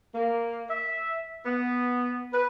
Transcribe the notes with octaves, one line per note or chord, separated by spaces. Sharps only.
A#3
E5
B3
B4